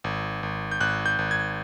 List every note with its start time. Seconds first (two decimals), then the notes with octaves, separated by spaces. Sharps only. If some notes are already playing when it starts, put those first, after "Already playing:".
0.04 G#1
0.43 G#1
0.71 G6
0.81 G#1 F#6
1.06 G6
1.19 G#1
1.31 G#6